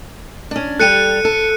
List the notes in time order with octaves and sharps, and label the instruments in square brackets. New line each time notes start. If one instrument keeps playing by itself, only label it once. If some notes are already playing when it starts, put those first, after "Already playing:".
[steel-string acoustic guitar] C#4 D4
[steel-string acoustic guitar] G3 G4 A4 [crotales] F#6 C#7 D#7
[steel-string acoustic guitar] A4